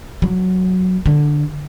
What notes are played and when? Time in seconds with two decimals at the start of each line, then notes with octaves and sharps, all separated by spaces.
0.22 F#3
1.06 D3